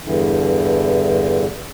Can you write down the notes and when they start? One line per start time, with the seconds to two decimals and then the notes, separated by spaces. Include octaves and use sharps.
0.04 E2 G2 D3 E3